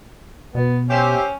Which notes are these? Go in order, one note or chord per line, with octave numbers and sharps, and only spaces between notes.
B2 B3
C#4 G4 C5 E5